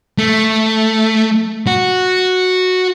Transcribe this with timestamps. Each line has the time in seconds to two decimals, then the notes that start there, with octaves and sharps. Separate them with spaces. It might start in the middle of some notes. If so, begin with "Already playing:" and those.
0.18 A3
1.67 F#4